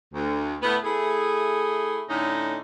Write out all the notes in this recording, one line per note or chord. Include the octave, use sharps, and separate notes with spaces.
D2
A2 A3 B3
A3 E4 G#4
A2 D3 C#4 D#4 D#5